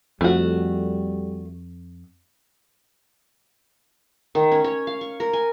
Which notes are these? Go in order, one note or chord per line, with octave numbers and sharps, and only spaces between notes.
F2 G3 A3 F#4
D#3
C#4
C#5
F5
C#6
A#4
G#5